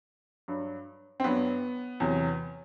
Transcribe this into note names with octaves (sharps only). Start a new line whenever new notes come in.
G2 F#3
C4
G2 F#3 B3
E2 C3 F#3